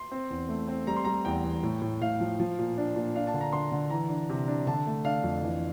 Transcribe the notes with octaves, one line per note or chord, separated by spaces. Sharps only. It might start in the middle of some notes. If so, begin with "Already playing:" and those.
Already playing: C6
C4
E2
A3
C4
G3 A#5
C6
G3 A#5
E2 G5
E2
A2
A2
A2 F5
F3
F3
A#2
D4
A#2
D4 F5
A5
D3
A#5
D3 C6
D3
E3 A#5
D4
C3
D4
D3 A5
A3
D4 F5
F2
E3